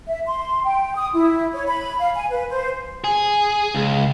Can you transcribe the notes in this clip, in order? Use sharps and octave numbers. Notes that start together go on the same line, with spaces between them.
E5
C6
G5
D#6
E4
C#5
B5
F5
G#5
B4
C5
G#4
C#2